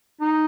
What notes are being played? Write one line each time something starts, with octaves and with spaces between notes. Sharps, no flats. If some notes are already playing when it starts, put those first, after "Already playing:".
D#4